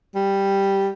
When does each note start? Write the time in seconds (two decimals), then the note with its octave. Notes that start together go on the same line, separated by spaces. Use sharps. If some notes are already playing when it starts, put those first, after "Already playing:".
0.15 G3